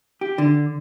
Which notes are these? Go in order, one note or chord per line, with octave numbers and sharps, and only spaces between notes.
G4
D3